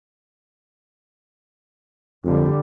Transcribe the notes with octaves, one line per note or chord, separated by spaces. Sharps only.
F2 D3 G3